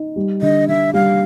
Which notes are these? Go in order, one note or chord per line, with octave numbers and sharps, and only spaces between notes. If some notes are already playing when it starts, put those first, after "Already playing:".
Already playing: D#4
G3
D3 D#5
D3 E5
G3 F5